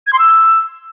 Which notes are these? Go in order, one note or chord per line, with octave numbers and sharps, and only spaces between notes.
G#6
C6
E6